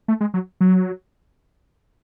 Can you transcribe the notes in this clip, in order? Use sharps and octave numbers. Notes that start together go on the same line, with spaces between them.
A3
G#3
F#3
F#3